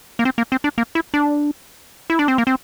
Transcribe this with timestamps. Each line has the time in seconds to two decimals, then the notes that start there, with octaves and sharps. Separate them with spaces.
0.19 A#3
0.25 C4
0.38 A#3
0.52 C4
0.64 D4
0.78 A#3
0.95 E4
1.14 D4
2.10 E4
2.19 D4
2.28 C4
2.38 A#3
2.47 C4